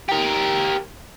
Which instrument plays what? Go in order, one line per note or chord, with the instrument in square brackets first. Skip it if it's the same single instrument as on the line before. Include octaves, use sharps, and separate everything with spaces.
[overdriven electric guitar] G4 A#4